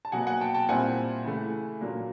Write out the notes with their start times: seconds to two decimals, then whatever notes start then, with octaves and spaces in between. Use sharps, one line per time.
0.05 A5
0.12 B2 F#3 A#3 F#5 G#5
0.27 F#5 G#5
0.41 G5 A5
0.54 G5 A5
0.68 A#2 G3 C4 E4 F#5 G#5
1.25 C#3 E3 A3
1.81 A#2 F#3 A#3 D4